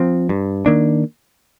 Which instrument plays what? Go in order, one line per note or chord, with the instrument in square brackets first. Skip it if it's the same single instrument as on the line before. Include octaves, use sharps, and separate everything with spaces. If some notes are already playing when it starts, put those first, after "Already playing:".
Already playing: [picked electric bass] F3 C4
G2
D#3 A#3 D4